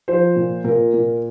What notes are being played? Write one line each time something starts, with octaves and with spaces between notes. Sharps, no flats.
F3 C5
A#2
A#2 A#4
A#2